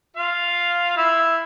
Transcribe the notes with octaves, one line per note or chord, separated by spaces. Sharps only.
F4 F5
E4 E5